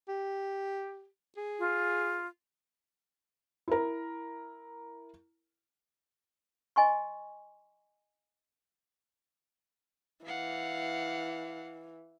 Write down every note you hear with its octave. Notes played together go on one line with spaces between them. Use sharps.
G4
G#4
F4
E4 A#4
D#5 G#5 C6 C#6
E3 F5 F#5